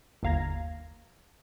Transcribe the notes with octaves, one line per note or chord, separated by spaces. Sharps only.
G1 D#2 F5 A#5 G#6 A#6